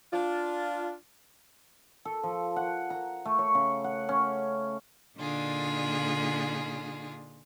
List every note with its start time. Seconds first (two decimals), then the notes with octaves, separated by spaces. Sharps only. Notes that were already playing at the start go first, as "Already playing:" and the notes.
0.12 D4 F4
2.05 A4
2.23 F3
2.56 F#5
2.90 A#5
3.25 A3
3.39 C#5
3.55 C#3
3.84 F#5
4.09 C#4
5.19 A#2 D3 D4 D#4 F4 G#4